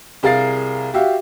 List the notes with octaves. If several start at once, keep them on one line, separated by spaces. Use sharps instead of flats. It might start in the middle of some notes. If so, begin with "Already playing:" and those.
C2 G#4 A#4 F5 A6 C7
F#4 G4 E5 F5